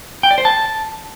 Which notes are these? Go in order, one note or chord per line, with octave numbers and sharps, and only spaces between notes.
G5
D5
C5
A5